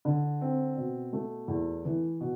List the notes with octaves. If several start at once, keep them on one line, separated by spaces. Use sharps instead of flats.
D3
C4
B2
A3
E2
E3
B2